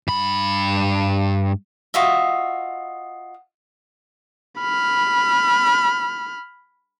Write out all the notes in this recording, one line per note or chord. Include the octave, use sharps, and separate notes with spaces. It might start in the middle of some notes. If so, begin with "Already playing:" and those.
G2 B5
F4 F#4 D#5 E5
B5 F6